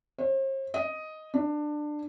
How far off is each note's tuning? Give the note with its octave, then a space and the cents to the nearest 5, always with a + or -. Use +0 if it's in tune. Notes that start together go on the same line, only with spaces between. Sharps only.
C5 +45
D#5 +5
D4 +20